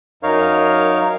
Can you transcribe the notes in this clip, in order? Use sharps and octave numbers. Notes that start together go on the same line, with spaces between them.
F#2 D#4 A#4 C#5 F5